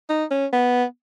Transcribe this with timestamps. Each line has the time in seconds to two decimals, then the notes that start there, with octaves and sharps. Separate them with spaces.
0.09 D#4
0.31 C#4
0.53 B3